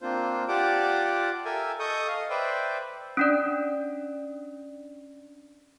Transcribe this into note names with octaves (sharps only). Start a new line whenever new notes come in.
A#3 C4 D4 F4 C5
F4 G4 D5 F#5 A5 D6
A4 A#4 E5 G5 G#5
A4 D#5 C#6 D#6 G6
D#5 F5
B4 C5 D5 E5 G5
C#4 D4 D5